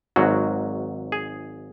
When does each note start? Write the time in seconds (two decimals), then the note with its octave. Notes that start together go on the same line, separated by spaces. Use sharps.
0.16 G#1 G#2 F#3 F#4
1.12 G#4